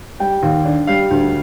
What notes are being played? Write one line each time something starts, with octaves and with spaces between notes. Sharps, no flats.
G3 G5
D#2
D4
G3 F5
D2